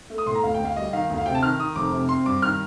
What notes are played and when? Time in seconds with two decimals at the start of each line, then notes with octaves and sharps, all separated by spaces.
0.10 A3
0.18 D#6
0.27 A2 C6
0.35 A#5
0.43 D2 F5
0.54 G5
0.60 D2
0.65 F5
0.76 G3 D#5
0.93 D#3 F5
1.10 D2
1.18 F5
1.26 C3 G5
1.35 A5
1.43 D#3 F6
1.59 D#3 D#6
1.76 F1 D6
1.92 C3
2.09 C4 C6
2.26 G2 D6
2.42 D#3 F6